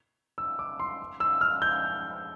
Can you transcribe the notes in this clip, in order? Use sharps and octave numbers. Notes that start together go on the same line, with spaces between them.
E6
D6
C6
E6
F6
G6